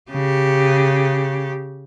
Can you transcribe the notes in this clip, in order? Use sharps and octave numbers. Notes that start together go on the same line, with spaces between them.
C#3 G4